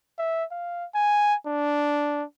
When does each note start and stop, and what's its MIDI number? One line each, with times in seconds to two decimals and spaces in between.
0.19 0.44 76
0.51 0.85 77
0.95 1.35 80
1.47 2.24 62